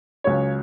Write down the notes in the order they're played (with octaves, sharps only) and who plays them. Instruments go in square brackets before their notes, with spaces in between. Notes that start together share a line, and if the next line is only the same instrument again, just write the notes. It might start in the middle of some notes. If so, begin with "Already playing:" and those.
[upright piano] C#2 C#3 F#3 C#5